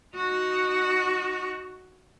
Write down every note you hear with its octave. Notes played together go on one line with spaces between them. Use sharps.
D#4 F#4